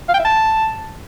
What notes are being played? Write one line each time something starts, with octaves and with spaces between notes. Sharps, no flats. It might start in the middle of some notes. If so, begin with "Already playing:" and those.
F5
G5
E5
A5